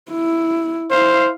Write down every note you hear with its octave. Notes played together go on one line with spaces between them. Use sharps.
E4
E4 C5 F5